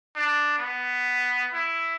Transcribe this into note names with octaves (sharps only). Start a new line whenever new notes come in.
D4
B3
E4